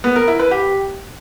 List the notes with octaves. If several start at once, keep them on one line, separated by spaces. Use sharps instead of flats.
B3
A#4
E4
B4
G4